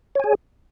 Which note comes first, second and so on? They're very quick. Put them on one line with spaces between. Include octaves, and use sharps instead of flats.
C#5 G#5 G#4